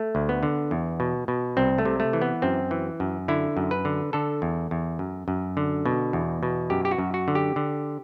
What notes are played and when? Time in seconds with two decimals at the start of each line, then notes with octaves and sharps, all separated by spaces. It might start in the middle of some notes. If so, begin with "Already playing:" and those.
Already playing: A3
0.15 D2
0.29 B3
0.43 D3
0.71 E2
1.00 B2
1.28 B2
1.57 C2 C4
1.78 A3
1.85 C3
2.00 A3
2.13 E3
2.22 B3
2.42 F#2 C4
2.71 E3
3.00 F#2
3.28 D3 E4
3.57 F#2
3.71 B4
3.85 D3
4.13 D3 A4
4.42 E2
4.71 E2
4.99 F#2
5.28 F#2
5.57 D3
5.86 B2
6.13 E2
6.43 B2
6.70 F#2 G4
6.85 G4
6.91 F#4
6.98 F#2
7.14 F#4
7.28 D3
7.35 G4
7.56 D3